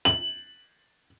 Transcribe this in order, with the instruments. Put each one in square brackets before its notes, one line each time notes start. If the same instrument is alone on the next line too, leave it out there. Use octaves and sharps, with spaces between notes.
[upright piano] F#7